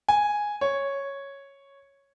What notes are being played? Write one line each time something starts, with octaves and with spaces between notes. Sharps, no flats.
G#5
C#5